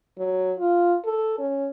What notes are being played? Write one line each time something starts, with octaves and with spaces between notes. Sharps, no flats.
F#3
F4
A4
C#4